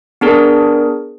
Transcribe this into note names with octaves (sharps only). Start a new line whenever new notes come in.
B3 D4 G#4 A#4